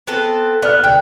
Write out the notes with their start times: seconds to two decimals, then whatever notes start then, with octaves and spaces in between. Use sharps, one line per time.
0.07 B3 C4 A4
0.62 B3 D5 F6
0.84 D3 G5